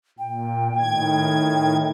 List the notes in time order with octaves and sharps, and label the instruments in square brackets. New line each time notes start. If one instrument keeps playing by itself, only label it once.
[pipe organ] A#2 [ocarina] G5
[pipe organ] A2 D#3 G#6